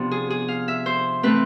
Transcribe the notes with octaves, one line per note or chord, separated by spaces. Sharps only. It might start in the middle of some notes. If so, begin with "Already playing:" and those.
Already playing: C3 F3 B3 D4
G#4
G#4
F5
E5
C5
E3 A3 C4 B4